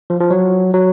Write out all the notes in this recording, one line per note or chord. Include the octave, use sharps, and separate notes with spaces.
F3
F3
F#3
F#3